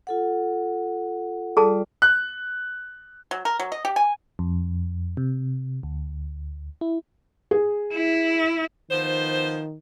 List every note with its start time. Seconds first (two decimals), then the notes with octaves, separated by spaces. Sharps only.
0.07 F4 A4 F#5
1.57 G3 F4 G#4 A4 D5 A5
2.02 F#6
3.31 F#3
3.45 A#4
3.59 F#3
3.72 D#5
3.85 G4
3.96 G#5
4.39 F2
5.17 C3
5.83 D2
6.81 E4
7.51 G#4
7.94 E4
8.90 D#3 F3 B3 C5